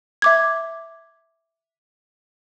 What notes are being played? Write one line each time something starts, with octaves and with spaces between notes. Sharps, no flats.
E5 D6 G#6